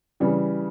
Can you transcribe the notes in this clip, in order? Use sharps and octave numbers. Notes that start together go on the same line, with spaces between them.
C#3 E3 G3